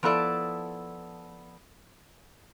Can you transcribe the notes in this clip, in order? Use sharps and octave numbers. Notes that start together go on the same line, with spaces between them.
F3 B3 E4 A4 D5